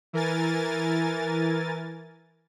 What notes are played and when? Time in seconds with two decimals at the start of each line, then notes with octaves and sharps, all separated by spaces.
0.13 E3 A#4 G#5 A6